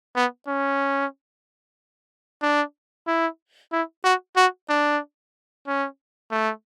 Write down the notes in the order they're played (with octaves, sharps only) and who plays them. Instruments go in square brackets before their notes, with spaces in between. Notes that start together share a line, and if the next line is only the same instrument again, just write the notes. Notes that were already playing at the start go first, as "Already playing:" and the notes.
[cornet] B3
C#4
D4
E4
E4
F#4
F#4
D4
C#4
A3